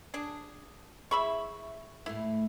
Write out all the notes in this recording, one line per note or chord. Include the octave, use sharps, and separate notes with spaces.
D4 G#4
E4 G#4 C#5 E5 B5 C#6
A2 A3 B3 E4